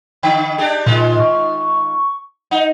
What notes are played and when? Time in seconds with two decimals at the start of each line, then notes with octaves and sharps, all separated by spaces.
0.23 D3 G5
0.58 D4 G4 G#4
0.86 A#2 D#3 G#3 F4
1.20 C#6
2.51 D#4 F#5